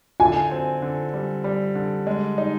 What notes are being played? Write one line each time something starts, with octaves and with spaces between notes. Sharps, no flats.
D3 G#5
C4
D3
G3
G3
D3
G#3
D#4